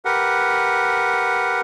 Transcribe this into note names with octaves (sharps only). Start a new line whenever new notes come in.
G4 A#4 B4 F#5